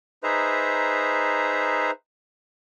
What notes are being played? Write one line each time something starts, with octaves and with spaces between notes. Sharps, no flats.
D#4 G#4 B4 C5 E5 A#5